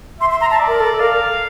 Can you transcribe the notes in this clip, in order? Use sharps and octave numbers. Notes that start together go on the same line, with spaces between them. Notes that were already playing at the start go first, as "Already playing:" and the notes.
E5 C6
C6
A#5
A5
D5
A#4
A4
A#4 F5